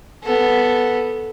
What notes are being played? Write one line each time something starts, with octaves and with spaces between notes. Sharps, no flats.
B3 A4